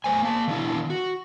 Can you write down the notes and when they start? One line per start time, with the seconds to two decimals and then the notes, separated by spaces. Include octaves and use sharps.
0.04 A3 B4 C5 G#5
0.22 A#3 A5
0.48 D#3 E3 B3 D4 E4
0.90 F#4